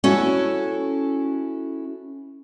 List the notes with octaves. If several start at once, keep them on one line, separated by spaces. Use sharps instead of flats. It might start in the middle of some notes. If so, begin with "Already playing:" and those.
C#4 E4 F#4 A4